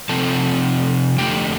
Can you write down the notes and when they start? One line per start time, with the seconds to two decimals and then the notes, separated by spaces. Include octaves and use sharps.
0.09 C3 F3 C4 A4 A5
1.18 F2 D3 A3 G4 G5